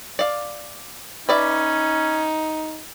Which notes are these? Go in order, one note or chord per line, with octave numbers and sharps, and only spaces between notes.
D5 F5
C#4 D#4 B4 D5 E5